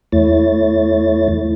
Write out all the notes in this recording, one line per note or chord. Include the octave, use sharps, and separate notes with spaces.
E2 A3 E4 C#5 A6